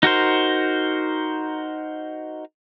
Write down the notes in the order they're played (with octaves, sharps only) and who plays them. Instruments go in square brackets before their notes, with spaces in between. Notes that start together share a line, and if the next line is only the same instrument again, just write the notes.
[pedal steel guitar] D#4 F#4 A#4 C5